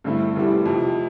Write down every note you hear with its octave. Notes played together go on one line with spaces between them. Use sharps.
G2 D3 A3 C4 E4
F1 E2 E3 G3
F2 C3 F3